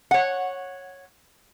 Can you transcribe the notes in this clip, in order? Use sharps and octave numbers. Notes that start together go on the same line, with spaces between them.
C#5 F#5